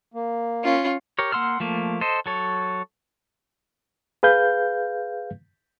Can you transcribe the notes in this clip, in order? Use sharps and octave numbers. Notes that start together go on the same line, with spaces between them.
A#3
C#4 F4
G4 A#4 C#5
A#3 F#5 C6 E6 F6
F3 A3 A#3
A4 C5 D#5
F#3 A4 C#5
G#4 B4 F5 G6